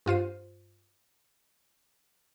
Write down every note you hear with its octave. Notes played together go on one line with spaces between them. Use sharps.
G2 F4 C5 D#7